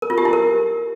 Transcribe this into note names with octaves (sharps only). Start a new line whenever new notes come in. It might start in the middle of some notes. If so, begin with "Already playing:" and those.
A#4
F4
G4
E4
A#4